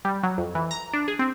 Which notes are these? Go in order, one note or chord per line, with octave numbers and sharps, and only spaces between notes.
G3
F#3
F2
E3
A#5
D4
G#4
C4